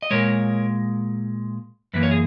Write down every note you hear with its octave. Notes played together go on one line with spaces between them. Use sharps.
D#5
A#2 G#3 A#4 C#5
F#2 E3 A#3 B4
C#5
G#4